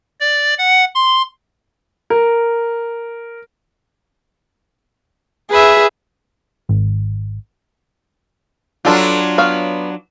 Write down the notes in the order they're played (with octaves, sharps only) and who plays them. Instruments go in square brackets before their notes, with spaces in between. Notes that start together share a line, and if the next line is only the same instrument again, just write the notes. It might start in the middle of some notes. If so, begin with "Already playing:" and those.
[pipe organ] D5
F#5
C6
[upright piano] A#4
[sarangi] G#4 [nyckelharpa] B4 E5
[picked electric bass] G#1
[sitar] F#3 D4 F4 [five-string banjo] G3 A4 B4
[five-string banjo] B3 C#5 F5